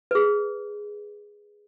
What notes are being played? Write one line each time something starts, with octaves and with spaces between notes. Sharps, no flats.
G#4 B4